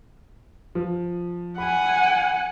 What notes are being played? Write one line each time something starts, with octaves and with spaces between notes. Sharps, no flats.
F3
F#5 G#5 B5